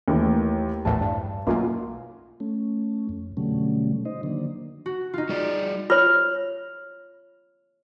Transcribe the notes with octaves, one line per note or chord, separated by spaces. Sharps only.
D#2 E3 A3
A#1 E2 A2 A5
G2
B1 F#2 A#3 F4
A3 C#4
F2
B2 D3 F#3 G3 A3 C#4
D#4 C5 D#5
D3 D#3 F#3 A#3 D4
F#4
D#4 F4
G3 G#4 D5
F4 C#5 F6